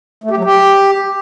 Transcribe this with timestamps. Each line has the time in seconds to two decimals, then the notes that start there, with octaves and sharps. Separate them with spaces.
0.24 A3
0.31 G4
0.38 F#3
0.44 G4